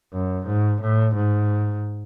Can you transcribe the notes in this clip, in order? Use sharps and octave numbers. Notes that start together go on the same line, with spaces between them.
F#2
G#2
A2
G#2